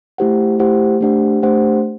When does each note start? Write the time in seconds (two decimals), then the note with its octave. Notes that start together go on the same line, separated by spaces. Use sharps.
0.18 A3 E4 G4 C5 F#5
0.59 A3 E4 G4 C5 F#5
1.01 A3 D4 G4 C5 F#5
1.42 A3 D4 G4 C5 F#5